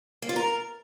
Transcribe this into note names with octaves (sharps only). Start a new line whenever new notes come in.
A#3
F4
A#4